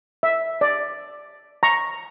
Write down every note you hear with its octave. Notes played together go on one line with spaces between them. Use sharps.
E5
D5
A#5 C#6